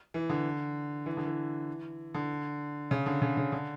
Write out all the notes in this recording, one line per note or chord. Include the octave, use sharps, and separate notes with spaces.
E3
D3
E3
D3
E3
D3
C#3
D3
C#3
C#3
D3